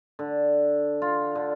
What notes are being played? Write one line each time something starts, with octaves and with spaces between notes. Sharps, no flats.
D3
F4
D3